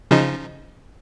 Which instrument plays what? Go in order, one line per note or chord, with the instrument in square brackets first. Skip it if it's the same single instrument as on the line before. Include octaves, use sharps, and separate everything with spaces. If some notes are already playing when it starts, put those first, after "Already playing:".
[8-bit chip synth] C#3 F3 D#4